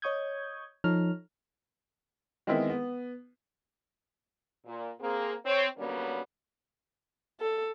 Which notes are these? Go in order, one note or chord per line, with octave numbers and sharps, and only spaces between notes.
C#5 D#5 C#6 D#6 G6 G#6
F3 D#4 A4 C#5 A#5 F6
D#3 G#3 B3 C4 E4
B3
A#2
A#3 C4 G#4
C4 C#5
D3 F#3 G3 A#3 B3 C#4
A4